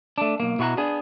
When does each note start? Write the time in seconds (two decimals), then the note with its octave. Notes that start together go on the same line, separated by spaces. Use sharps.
0.18 A3 D4
0.40 B1 A#3
0.59 B2 E4 F#4 A#4 F#5 A#5
0.77 B3 D4 G#4